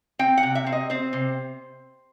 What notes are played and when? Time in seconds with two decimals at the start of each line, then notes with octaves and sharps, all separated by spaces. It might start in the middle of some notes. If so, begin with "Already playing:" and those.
0.19 C4 G5
0.38 F#5
0.43 C3
0.55 E5
0.66 C4
0.72 D#5
0.90 C4 C5
1.13 C3